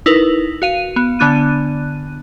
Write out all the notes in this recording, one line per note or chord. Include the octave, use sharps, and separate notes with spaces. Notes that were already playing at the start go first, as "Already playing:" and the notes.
D#4 E4 A#4 B4
F#4 F5 D#7
B3
D3 B3 D4 F#6 D#7